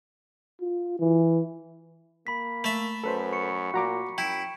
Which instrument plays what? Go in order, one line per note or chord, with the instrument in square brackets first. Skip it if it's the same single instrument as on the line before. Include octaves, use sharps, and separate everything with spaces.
[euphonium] F4
E3
[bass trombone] A#3 [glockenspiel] B5 B6
[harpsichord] A3 E5
[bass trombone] F#2 [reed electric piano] A4 B4 C5
[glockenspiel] C#6 C#7
[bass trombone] A#2 [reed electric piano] F#4 A#5 D6
[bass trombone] F#2 [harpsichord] E4 [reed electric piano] G5 [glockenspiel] D7 E7